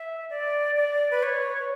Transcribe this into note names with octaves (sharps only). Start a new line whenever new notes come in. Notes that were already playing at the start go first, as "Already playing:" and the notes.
Already playing: E5
D5
D5
B4
C#5